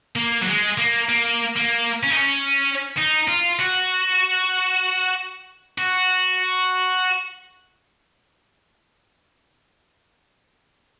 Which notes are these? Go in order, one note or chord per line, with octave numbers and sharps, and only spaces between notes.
A#3
F#3
G#3
A#3
A#3
A#3
C#4
D#4
C#4
D#4
F4
F#4
F#4